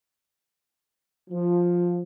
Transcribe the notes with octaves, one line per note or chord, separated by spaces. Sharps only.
F3